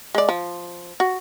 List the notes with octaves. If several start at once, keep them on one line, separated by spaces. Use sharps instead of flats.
G#3 D5
F3
F#4